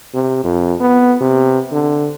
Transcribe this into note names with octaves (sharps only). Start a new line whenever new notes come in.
C3
F2
B3
C3
D3